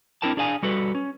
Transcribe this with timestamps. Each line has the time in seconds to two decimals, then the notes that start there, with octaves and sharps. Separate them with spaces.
0.22 C4 D4 E4 A#4 G5 A5
0.37 D4 G#4 D5 F5 G#5
0.63 G3 F#4 A4 B4
0.95 C#4